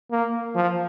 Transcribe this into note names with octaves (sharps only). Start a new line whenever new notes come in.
A#3
F3